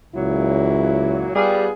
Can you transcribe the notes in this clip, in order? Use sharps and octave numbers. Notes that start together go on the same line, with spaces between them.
C#2 A#2 F#3 E4
G3 B3 F4 G#4